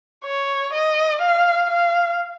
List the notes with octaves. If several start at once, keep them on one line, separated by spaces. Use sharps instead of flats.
C#5
D#5
F5
F5